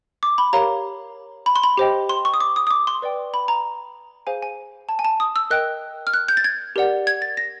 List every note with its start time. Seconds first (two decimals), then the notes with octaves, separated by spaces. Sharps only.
0.23 D6
0.38 B5
0.53 G4 A#4 C#5 F5 A#5
1.46 B5
1.56 C6
1.63 B5
1.77 G4 C5 D#5 G5
2.09 C6
2.25 C#6
2.34 D#6
2.41 D6
2.56 D#6
2.67 D#6
2.71 D6
2.87 C6
3.02 B4 D5 G5
3.34 B5
3.48 A#5
4.27 G#4 C5 F5 G#5
4.43 G#5
4.89 A5
4.99 G#5
5.05 A5
5.20 D#6
5.36 E6
5.50 A#4 D#5 G5 F#6
6.07 F6
6.14 F#6
6.28 G6
6.37 A6
6.44 G#6
6.76 G4 A#4 D5 F#5
7.07 G#6
7.22 A6
7.37 A#6